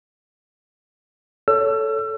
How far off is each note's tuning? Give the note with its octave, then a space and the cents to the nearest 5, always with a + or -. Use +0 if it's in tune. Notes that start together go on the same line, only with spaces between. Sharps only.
A4 +0 C#5 +20 E6 +35